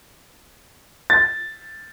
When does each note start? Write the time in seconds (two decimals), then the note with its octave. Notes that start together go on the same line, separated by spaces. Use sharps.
1.10 A6